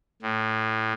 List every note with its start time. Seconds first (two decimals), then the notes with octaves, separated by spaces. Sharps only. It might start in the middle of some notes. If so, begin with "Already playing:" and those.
0.22 A2